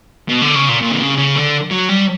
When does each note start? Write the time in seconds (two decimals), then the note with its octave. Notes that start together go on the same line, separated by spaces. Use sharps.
0.28 B2
0.42 D3
0.55 C#3
0.69 A#2
0.81 A#2
0.91 D3
1.00 C#3
1.17 C#3
1.36 D3
1.71 F#3
1.89 G3